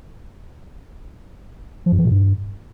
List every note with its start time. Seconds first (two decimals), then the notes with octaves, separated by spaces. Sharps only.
1.86 F3
1.92 F#2
1.99 E3
2.05 A#2
2.11 G2